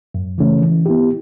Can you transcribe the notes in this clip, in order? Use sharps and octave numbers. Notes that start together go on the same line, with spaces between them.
F#2
C#3 E3 A3 C#4
E3
B3 E4 G4